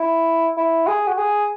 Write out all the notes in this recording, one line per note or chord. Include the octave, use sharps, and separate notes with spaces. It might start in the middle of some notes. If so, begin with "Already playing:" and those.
Already playing: E4
E4
G#4
F#4
G#4